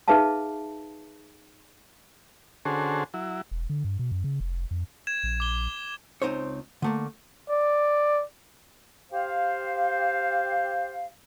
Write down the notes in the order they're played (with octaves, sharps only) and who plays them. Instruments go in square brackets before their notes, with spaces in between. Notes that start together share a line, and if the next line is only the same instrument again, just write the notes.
[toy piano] D#4 G#4 B4 E5 F5 A5
[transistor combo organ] D3 C#4 F#4 G#4 A4 C5
F#3 E4
[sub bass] E1
D3
G2
B2
F#2
C#3
F1
F2
[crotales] G#6 E7
[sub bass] A#1
[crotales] D6 G7
[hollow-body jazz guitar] C#2 B2 C4 D#4 C5 C#5
D3 A3 A#3
[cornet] D5
[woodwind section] G4 C5 F5